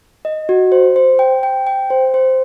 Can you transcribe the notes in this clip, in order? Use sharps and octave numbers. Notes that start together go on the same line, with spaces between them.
D#5
F#4
C5
C5
G5
G5
G5
C5
C5